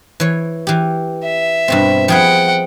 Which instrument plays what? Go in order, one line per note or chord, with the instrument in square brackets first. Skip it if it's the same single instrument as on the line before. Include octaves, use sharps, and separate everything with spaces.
[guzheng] E3 C#5
E3 G4
[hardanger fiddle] E5
[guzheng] G2 B2 C4
[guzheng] F3 G#4 B4 [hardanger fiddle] F#5 G5